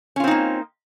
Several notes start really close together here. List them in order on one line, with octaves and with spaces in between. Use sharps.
C#4 F4 C4 D#4 A#3